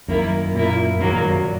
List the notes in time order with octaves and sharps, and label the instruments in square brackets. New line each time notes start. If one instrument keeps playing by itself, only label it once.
[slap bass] F#2 [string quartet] D#3 A#3 E4
[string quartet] A#2 A#3 E4
[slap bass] E2 G#2 [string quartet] D#3 F#3 A#3
[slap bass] F#2 A#2
F#2 A#2